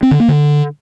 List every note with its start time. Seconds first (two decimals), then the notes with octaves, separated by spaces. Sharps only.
0.03 C4
0.11 D3
0.20 A#3
0.28 D3